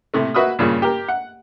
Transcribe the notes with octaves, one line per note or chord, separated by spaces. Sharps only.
A2 C3 A3
A#3 F#4 B4 E5 D#6 E6
G2 A#2 C#3
G4 A#4
F#5